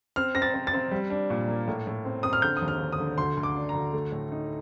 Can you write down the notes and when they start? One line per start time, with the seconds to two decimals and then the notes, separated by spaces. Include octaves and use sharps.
0.16 C4 F6
0.35 C4 A#6
0.42 A6
0.54 C4
0.67 A6
0.73 C4
0.91 G3
1.10 D4
1.30 A#2
1.48 A#3
1.68 A2
1.87 A2
2.05 C4
2.23 C4 D#6
2.33 F6
2.42 D3 G6
2.57 D#6
2.62 D#2
2.68 F6
2.80 D3
2.92 D#6
2.99 D3
3.18 D2 C6
3.37 D2
3.43 D6
3.56 D4
3.69 A#5
3.75 D2
3.93 A3
4.12 A2
4.32 D#4